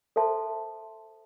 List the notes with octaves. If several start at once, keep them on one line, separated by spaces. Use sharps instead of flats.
A4 C5 E5 A5 C6